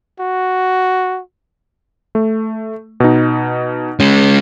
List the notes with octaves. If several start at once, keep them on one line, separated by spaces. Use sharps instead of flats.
F#4
A3
B2 D#4
G#3 C#4